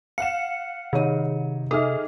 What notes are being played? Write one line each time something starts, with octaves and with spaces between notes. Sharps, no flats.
F5 F#5 C#7 E7
C3 D#3 D#4 C#5 D#7
D#3 G#4 A4 D#5 E5 D#6 F6